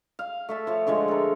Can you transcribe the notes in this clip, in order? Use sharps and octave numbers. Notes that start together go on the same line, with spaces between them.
F5
A3 E5 A5
F3 C#5
D3 F3 G#3 C#5
A4 A#4